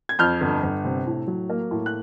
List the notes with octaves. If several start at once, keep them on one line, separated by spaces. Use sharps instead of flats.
G#6
F2 F6 G6
G1
G1
C3
A2
F#3
A#3
A2
F#6